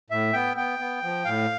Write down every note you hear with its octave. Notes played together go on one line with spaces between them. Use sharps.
A2 E5
B3 G5
B3 G5
B3
F3
A2 F5